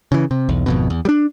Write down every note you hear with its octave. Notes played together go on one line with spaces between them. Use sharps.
C#3 E3
C3
B1 E2
G#1 F2 B2
E2
G3 D4